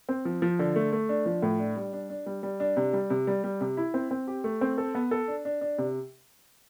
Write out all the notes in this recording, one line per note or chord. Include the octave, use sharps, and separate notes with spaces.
C4
F3
F3
D3
A3
A3
D4
F3
A2
D4
G3
D4
D4
G3
G3
D4
C3
G3
C3
G3
G3
C3
E4
C4
C4
G4
A3
C4
A4
B3
A4
D4
D4
D4
C3